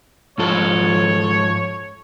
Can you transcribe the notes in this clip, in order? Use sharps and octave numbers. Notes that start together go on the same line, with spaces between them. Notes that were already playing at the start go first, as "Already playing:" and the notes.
G#2 F3 A4 C#5